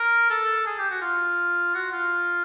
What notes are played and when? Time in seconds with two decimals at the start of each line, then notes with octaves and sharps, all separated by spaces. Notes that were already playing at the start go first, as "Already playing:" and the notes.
Already playing: A#4
0.30 A4
0.66 G#4
0.78 G4
0.90 F#4
1.01 F4
1.75 F#4
1.92 F4